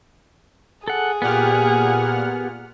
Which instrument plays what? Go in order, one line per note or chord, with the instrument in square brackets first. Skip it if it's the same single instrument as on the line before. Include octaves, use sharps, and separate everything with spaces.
[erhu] G#4 [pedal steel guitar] A4 F#5
[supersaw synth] A#2 F#5 F6 [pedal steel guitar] B3 G4